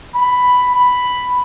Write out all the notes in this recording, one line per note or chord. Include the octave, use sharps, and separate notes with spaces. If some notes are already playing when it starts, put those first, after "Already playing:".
B5
B5